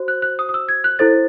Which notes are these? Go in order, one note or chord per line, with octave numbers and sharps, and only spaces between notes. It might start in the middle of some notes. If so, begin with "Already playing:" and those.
Already playing: F#4 C5
F#6
F#6
D#6
D#6
E6
G#6
F#6
E4 A4 C5 A6